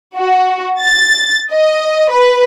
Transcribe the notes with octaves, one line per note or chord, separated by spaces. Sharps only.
F#4
A6
D#5
B4